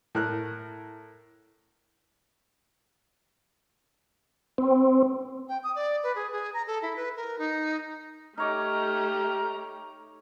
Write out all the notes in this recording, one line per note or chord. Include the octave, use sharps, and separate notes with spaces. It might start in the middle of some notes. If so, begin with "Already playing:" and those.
A2 A#4 F#6
C4
G5
D#6
D5
B4
G#4
G#4
A#5
A4
E4
B4
A#4
D#4
A3 D#4 G4 C#5 A#5 D6 F6